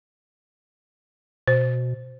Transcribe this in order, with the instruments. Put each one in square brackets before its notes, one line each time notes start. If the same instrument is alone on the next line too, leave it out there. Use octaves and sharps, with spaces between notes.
[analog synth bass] B2 [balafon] C5